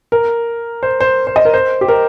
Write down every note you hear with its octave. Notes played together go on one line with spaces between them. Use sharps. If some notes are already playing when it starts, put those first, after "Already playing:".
A#4
C5
C5
C5
D#5
A#4
C5
G4
A#4